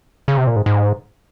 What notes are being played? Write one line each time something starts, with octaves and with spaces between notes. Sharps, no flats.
C#3
C3
A#2
G#2
G#2